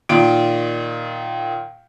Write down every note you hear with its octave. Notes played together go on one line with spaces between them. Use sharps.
A#2 D#3 D7